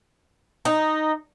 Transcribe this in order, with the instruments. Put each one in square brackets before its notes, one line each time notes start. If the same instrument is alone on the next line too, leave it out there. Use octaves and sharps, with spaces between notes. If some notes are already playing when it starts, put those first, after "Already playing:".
[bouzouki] D#4